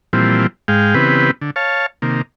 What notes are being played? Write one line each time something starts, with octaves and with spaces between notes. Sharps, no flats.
A#2 E3 F3 G3 C4
G#2 G#3 F5 G5
C#3 E3 B3 C4 G4 B4
D3
C#5 F5 A5
C3 D#3 A#3